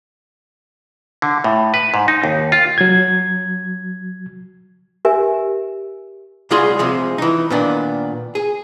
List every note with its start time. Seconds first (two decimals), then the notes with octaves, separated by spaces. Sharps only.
1.22 D3
1.44 A2
1.74 B4
1.94 G#2
2.08 D#4
2.24 D#2
2.52 F4
2.78 F#3 G#6
5.05 G4 A#4 E5 G#5
6.51 C2 G#3 F4 F#4 G#4 C6
6.79 C3 F3 G#3
7.18 E3 D#4
7.50 A#2 D#3 B3 D4
8.35 G#4